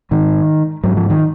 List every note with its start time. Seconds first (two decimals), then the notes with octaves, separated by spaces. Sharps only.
0.11 G#2 D#3
0.84 G#2 F#3
0.97 F3
1.10 D#3